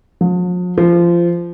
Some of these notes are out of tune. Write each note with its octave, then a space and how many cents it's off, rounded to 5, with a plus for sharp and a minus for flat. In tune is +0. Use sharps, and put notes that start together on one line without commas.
F3 +45
F3 -20